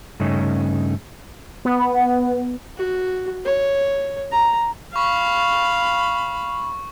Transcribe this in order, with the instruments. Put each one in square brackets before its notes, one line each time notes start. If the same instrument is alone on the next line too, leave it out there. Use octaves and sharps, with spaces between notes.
[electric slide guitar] G2 C#3 A3 C#4 D#4
[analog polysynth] B3
[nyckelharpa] F#4
C#5
A#5
[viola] F5 [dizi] B5 [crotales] C#6